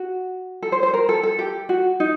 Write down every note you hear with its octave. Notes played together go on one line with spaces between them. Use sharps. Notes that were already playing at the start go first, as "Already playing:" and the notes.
Already playing: F#4
A4
C5
C5
A#4
A4
A4
G4
F#4
D#4